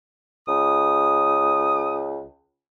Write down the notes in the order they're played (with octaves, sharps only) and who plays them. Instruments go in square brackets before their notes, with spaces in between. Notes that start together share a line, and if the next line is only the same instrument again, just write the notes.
[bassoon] C#2 [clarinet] D#6